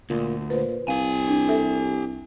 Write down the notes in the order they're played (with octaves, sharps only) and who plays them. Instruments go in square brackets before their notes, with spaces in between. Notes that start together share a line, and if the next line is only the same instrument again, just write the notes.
[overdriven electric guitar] D2 [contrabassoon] A#2
[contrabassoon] A#2 [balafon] B4 C5
[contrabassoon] C2 [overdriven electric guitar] G4 G#5 [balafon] F5
[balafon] D4
A4 E5